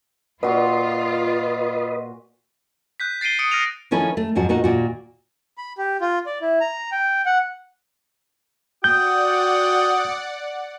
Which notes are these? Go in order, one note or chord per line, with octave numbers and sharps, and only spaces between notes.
A#2 F4 F#4 B4 D#5 C6
F#6 G6 B6
A6 C7 D7 D#7 G7
D#6 C#7 D7
F6 A#6 D7 D#7 F7
D#3 F3 C#4 E4 A4 B4
A3
F2 G#2 F3 F#3 F#4
A#2 B3 D#4 F#4
D#2 A#2 F#4
B5
G4
F4
D5
E4
A#5
G5
F#5
F#4 D5 F#5 G5 D#6 G6